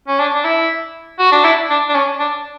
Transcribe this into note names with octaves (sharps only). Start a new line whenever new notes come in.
C#4
D4
D4
E4
F#4
D4
E4
D4
D4
C#4
D4